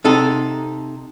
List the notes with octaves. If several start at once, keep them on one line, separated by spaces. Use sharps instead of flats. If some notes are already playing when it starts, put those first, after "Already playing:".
C3 D#4 A4